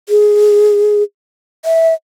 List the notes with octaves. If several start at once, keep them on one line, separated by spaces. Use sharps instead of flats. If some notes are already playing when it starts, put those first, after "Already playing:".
G#4
E5